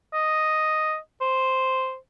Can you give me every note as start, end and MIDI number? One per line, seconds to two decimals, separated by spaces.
0.13 0.97 75
1.22 1.96 72